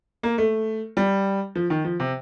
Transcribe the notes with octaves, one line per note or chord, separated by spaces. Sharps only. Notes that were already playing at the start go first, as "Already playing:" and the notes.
A#3
A3
G3
F3
D#3
F3
C3